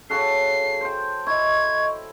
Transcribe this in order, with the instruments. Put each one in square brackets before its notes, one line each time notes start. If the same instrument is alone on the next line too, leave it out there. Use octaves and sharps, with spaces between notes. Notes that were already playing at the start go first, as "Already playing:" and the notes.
[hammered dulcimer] C#3 F#4 A4 [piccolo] C7
[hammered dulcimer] C5 G5
[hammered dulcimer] E4 [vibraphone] D#5 C#6 [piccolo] G#6